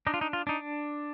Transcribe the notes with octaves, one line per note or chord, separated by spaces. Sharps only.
D4 D#4
F4
D#4
F4
D4 D#4